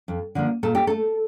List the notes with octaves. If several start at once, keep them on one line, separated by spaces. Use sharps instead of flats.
F2
D3 F3 A#3
A#2 A4
G4
A3 A4